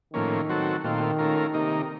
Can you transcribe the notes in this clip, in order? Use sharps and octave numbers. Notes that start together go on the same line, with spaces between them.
A2 D#3 F3 A#3 C#4
F#3 C4 F#4 A4
A#2 D#3 A3 C4 F4
A3 C#4 F4 A#4
C3 D#3 A#3 D#4